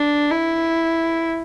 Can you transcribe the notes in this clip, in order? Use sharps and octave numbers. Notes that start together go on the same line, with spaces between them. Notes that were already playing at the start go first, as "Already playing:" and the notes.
Already playing: D4
E4